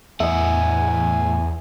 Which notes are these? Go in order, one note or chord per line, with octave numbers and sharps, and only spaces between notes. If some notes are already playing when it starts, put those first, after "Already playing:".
E2 A2 D#5 E5 F#5 G#5